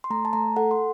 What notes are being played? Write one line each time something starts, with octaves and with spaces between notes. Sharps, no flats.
C6
A3 A#5
A5
A3 A#5
A4 F#5
C6